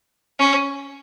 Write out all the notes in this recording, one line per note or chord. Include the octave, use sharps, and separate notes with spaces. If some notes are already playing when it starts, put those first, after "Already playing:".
C#4